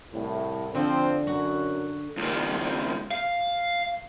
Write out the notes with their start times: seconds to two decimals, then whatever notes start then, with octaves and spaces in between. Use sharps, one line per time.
0.13 C2 A2
0.75 D3 F3 C4
1.27 F#2 F#4
2.17 C#2 D#3
3.11 F5